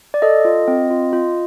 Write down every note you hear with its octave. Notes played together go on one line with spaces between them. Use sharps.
D5
A4 D#5
F4
C4
F4
F4